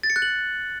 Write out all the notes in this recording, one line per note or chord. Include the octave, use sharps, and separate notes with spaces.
A6
C#7
F#6
F#7